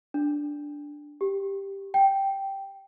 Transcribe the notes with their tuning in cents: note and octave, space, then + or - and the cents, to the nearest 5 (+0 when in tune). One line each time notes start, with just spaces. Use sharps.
D4 -5
G4 +5
G5 -5